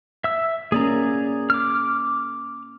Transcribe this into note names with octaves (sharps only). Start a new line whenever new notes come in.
E5 E6
A#3 C#4 G#4 D5 A#5
D6 F6